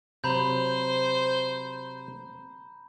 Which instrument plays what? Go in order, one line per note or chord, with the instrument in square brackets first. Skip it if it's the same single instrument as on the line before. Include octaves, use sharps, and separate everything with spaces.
[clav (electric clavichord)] C3 F#3 [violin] C5 [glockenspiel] A#5 B5 G6